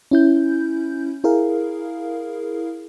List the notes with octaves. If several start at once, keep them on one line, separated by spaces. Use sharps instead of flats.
C#4 E4 G6
E4 G#4 A#4 F5